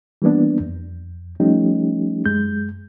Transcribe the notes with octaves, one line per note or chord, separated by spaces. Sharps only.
E3 G3 A#3 B3 D4
F2
F3 G3 A3 C#4 D#4 G4
F#2 G#3 G6